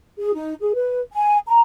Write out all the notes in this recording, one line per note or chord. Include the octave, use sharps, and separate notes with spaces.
G#4
D#4
G#4
B4
G#5
A#5